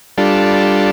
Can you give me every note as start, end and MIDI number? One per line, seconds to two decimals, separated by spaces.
0.18 0.91 55
0.18 0.91 62
0.18 0.91 65
0.18 0.91 69